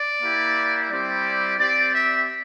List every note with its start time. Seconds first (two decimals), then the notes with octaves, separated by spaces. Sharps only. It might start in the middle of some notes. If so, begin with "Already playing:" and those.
Already playing: D5
0.21 A#3 E4 G4
0.90 G3 C4 E4 G4 D5
1.58 C4 G4 D5
1.94 E5